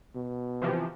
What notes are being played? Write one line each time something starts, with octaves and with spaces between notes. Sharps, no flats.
B2
C3 E3 F3